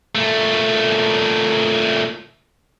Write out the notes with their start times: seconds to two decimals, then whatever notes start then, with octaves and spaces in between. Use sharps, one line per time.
0.15 A#2 A3